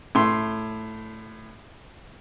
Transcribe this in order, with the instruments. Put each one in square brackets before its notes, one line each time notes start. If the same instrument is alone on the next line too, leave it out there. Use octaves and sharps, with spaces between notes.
[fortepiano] A2 C6